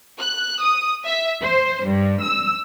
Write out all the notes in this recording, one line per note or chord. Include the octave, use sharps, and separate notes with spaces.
F#6
D#6
E5
C5
G2
E6